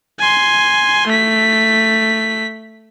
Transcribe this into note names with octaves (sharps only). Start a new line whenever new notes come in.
G#5 C6
A3 B6